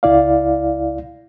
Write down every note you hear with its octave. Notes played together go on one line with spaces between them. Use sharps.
C#2 E4 D5 F5